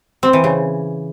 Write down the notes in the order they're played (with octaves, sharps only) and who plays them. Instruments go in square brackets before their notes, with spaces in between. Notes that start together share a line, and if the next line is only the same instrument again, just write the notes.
[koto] C4
E3
C#3